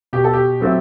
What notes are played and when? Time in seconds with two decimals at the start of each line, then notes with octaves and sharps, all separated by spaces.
0.13 B2 G4
0.24 A4
0.33 G4
0.60 F#3 A3 C4 E4